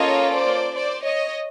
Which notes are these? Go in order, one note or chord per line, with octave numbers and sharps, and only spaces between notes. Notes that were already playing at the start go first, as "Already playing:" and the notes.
Already playing: A#3 C#4 F4 A4 C#5 D#5
C5 D5
C5 D5
C#5 D#5